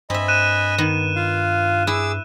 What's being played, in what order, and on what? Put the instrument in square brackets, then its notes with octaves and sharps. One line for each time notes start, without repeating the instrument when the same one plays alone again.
[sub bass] G2 [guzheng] C4 E5 [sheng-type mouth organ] D#5 G#5 B5
[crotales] F#6 D#7 E7
[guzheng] D#3 B3
[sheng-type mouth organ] F4 F5
[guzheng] E4 [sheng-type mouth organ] G#4 D6 E6